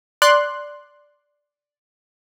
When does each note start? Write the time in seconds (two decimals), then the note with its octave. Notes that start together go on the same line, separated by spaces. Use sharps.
0.22 D5 C6 F#6